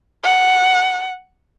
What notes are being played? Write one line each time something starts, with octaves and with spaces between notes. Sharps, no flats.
F#5